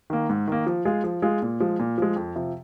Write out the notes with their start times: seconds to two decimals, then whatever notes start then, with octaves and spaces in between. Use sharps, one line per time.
0.10 D#3 A#3
0.29 G#2
0.48 D#3 A#3
0.67 F3
0.85 G#3 F4 G#4
1.04 F3
1.22 G#3 F4 G#4
1.42 A#2
1.60 F3 G#3
1.79 A#2
1.98 F3 G#3
2.16 F2
2.36 C3 F3